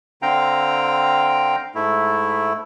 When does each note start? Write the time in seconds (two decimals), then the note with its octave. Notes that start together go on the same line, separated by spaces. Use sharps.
0.22 D3 C4 F5 G5 A#5
1.75 G#2 A3 E4